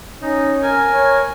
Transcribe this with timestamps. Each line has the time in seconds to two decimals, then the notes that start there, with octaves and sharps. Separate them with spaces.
0.22 C#4 D#4
0.63 A#4 G#5
0.93 C#5